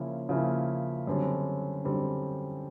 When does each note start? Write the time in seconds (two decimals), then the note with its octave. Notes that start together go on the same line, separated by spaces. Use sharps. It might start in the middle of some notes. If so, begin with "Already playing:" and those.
Already playing: C#3 F3 A#3 C#4 E4
0.29 C#3 F3 A#3 C#4 E4
1.07 F#2 D3 G3 C4
1.84 F#2 D3 G3 C4